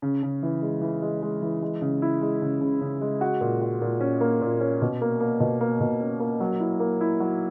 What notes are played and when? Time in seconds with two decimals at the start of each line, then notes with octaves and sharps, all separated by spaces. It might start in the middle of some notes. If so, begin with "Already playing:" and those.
0.02 C#3
0.23 C#3
0.43 E3
0.62 G#3
0.81 E3
1.02 G#3
1.22 G#3
1.42 E3
1.62 G#3
1.81 C#3
2.02 E4
2.21 G#3
2.42 C#3
2.61 C#3
2.81 C#3
3.01 G#3
3.21 F#4
3.41 A#2
3.61 F#4
3.82 A#2
4.01 C#4
4.21 A#3
4.42 A#2
4.61 C#4
4.82 B2
5.01 A#3
5.20 A#3
5.40 B2
5.61 A#3
5.80 B2
6.01 C#4
6.20 A#3
6.40 F#3
6.60 E4
6.80 A#3
7.01 E4
7.20 F#3